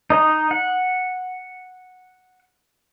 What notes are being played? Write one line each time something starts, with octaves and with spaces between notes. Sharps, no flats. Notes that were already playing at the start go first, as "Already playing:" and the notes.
D#4 D#5 A#5
F#5